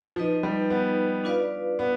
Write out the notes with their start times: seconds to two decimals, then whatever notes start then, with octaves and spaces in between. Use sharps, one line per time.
0.16 F3 D#4 B4 D#5
0.43 G3
0.70 B3
1.24 D4 F4 B4 D5 F5
1.79 B3